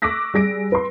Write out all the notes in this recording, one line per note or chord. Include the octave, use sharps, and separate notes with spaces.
C#6 D6 E6 F#6 A#6 B6
G3 G#4 A#6 D7
B4 C6